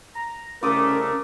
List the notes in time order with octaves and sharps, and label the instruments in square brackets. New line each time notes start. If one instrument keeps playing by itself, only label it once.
[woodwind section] A#5
[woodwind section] C2 C#3 A3 [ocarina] C#4 [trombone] A#4 [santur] D6 D#6